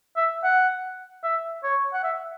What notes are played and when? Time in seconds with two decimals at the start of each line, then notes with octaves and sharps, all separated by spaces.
0.16 E5
0.44 F#5
1.23 E5
1.63 C#5
1.93 F#5
2.03 E5